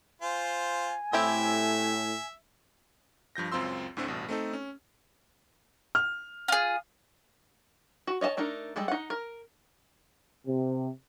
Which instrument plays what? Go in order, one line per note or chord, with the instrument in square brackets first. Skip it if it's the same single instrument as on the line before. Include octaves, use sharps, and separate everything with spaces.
[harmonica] F4 C5 [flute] G#5
[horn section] A2 [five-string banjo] C4 E4 G4 [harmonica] E5
[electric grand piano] G2 F3 G6 A#6
C#2 F#2 C4 F4 C6 E6
D2 A2 D3 A3 C4
A1 G2 B2
A3 C4 D#4 A4
C#4
[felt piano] F6
[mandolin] F4 G#4
[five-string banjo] F#4
C#5 D#5 E5 A5
A3 D4 D#4 A#4
G3 G#3 A4
D#4 F#5
A#4
[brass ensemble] C3